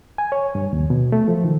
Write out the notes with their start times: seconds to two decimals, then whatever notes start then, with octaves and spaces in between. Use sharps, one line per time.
0.18 G#5
0.32 C#5
0.55 G2
0.73 D#2
0.90 B2
1.12 A3
1.28 F3
1.44 D#3